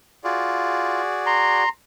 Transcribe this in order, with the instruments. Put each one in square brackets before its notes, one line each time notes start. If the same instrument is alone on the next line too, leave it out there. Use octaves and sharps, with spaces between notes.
[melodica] F4 [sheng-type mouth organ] F#4 G#4 D5
[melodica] A#5 C6